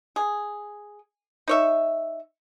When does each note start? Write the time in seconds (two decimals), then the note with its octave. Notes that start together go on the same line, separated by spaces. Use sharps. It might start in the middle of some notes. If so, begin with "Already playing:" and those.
0.16 G#4
1.48 D#4 C#5 E5